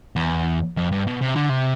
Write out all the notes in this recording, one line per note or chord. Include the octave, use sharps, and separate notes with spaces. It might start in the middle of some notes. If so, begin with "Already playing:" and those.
E2
F2
G2
B2
C3
D3
C3